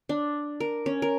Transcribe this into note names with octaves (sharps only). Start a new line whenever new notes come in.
D4
A#4
C#4
A#4